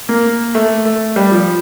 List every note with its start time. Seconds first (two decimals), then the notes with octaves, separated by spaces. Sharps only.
0.09 A#3
0.55 A3
0.85 A3
1.16 G3
1.32 F3